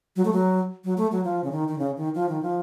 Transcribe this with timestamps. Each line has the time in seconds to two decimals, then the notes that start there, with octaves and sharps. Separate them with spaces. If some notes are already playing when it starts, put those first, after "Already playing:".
0.16 F#3
0.25 A3
0.33 F#3
0.84 F#3
0.98 A3
1.12 F#3
1.24 F3
1.44 C#3
1.52 D#3
1.68 D#3
1.78 C#3
1.97 D#3
2.15 F3
2.29 D#3
2.42 F3